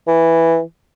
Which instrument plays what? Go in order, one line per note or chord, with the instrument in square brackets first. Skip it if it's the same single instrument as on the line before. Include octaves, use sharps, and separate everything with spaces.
[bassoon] E3